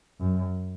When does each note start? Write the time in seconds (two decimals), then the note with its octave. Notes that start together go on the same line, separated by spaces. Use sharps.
0.20 F#2